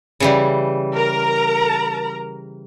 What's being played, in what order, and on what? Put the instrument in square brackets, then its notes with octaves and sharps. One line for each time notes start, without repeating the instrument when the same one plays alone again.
[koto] C#3 E3 G3
[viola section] A#4 A#5